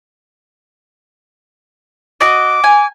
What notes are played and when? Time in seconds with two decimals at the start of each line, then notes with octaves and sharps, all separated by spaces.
2.21 F#4 D#5 D6
2.64 G#5